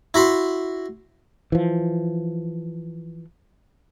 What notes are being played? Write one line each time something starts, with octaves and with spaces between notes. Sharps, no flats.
E4 F#4 B5 C6
E3 F3